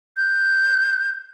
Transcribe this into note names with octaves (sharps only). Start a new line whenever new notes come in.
F#6 G6